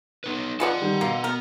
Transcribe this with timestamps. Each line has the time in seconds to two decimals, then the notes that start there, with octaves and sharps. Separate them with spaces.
0.24 B3 D#4 B4
0.60 G#3 B3 D4 F4 A4 F#5
0.81 D#3 G3
1.01 B2 A#3
1.24 B3 A#4